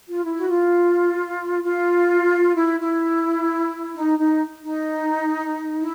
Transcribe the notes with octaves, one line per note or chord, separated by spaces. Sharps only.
F4
E4
F#4
F4
F4
E4
E4
D#4
D#4
D#4
E4